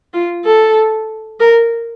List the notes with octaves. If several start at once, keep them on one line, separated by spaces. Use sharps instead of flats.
F4
A4
A#4